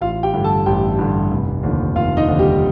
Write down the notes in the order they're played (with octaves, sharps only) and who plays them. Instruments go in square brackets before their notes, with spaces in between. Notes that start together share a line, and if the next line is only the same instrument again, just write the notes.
[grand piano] A1 F4 F5
G4 G5
G2 D3
A4 A5
A1 G4 G5
G2 D3
F1
D#2 D3 F3
F1 F4 F5
D#4 D#5
D#2 D3 F3
G3 G4